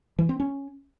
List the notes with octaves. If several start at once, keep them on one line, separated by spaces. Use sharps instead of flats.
E3
C4
C#4